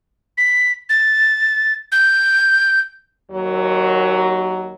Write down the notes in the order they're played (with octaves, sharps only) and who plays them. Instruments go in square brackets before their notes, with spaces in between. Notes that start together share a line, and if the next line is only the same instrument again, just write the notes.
[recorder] B6
A6
G6
[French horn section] D#2 F#3